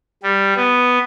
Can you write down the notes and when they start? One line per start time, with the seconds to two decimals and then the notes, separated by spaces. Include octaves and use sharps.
0.23 G3
0.56 B3